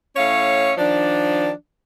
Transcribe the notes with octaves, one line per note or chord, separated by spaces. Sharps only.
A2 C#4 C#5 E5 F5
D#3 F3 D4